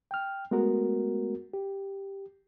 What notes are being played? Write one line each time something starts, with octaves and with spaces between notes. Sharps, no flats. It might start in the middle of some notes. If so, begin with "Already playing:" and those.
G5 F6
G#3 A3 B3 F#4 A#4
G4